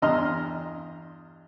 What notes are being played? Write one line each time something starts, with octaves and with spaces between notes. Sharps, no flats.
E2 G2 D#5 A#5 C6 F6